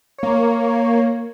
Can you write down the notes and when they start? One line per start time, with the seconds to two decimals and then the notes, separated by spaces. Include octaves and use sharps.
0.19 A#3 C#5